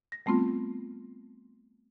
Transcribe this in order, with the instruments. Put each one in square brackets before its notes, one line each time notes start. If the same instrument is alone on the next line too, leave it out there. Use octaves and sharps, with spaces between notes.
[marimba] A#6
G3 A3 B3 C4 F4